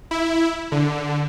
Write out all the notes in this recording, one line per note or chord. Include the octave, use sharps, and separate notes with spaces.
E4
D3